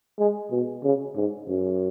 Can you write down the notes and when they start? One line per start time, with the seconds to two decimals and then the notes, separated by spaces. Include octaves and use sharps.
0.19 G#3
0.51 B2
0.83 C#3
1.16 G#2
1.48 F#2